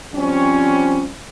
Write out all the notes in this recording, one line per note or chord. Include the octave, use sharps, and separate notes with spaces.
F3 G3 C4 C#4